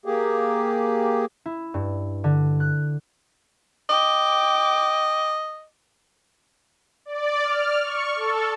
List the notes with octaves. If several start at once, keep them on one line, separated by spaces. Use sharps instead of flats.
A#3 G4 G#4
E4
G2
D3
F#6
D#5 G5 D6
D5
F6
C#6
A4